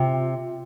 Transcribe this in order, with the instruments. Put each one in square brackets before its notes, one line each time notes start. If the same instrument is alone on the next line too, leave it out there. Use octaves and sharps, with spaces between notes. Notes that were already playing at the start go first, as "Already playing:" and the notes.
Already playing: [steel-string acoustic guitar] C3 [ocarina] F4